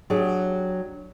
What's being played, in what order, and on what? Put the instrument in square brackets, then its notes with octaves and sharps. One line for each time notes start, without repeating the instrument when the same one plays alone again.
[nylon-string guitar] F#3 D4 G4 G#4